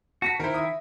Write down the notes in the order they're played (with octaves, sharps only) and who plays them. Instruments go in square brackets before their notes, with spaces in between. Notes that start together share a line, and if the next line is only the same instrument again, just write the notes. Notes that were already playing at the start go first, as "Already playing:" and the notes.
[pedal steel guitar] F#4 [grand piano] A5 A#6 B6
[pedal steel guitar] D#3 E4 [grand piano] A#4 C5
[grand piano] E5 D#6